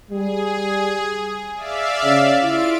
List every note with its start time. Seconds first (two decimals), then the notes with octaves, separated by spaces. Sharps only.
0.11 G3 G#4
1.56 D5 E5 F5
2.03 C#3
2.43 E4 F4 D7